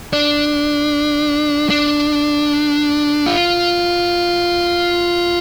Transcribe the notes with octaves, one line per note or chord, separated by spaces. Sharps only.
D4
D4
F4